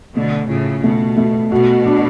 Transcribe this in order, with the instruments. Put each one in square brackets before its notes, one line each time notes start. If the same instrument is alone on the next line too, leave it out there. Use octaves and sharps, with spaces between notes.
[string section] B2 D3 [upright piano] A3
[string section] A2 C#3 [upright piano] F4
[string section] B2 [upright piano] A3
[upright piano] A3
[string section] B2 [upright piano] F#4
[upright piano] D4